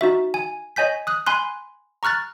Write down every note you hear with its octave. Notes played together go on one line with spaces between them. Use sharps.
D#4 F#4 E5
G#5
C#5 D#5 G#5 G6 B6
D#6 F#6
G#5 B5 C6 F#6
A#5 C#6 F6 F#6 A6